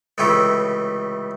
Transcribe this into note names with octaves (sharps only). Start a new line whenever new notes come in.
C#2 A2 C3 E3 A3 G4